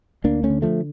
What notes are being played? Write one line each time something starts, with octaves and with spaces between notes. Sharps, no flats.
D2 A#3 D4
A3 C#4
D3
F3 A3